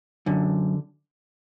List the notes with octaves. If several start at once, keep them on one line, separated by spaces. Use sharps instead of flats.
F#2 D3